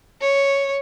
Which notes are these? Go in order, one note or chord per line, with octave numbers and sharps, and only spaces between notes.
C#5